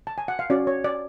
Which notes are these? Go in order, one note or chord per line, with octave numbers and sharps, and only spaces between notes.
A5
G#5
F#5
F5
C#4 F#4 C#5 D5
C#5
D5